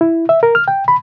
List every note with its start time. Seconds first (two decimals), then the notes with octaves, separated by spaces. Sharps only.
0.01 E4
0.29 E5
0.43 A#4
0.55 F6
0.68 G5
0.88 B5